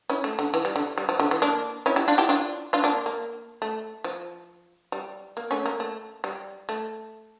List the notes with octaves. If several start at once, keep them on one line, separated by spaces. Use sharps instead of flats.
C#4 E4
A3
D3
E3
G3
D3
G3
F3
D3
E3
A#3 D4
C#4 E4
E4 G4
D4 F4
E4 G4
D4 F4
D4 F4
A#3 D4
A#3
A3
F3
G3
A#3
A3 C#4
A#3
A3
G3
A3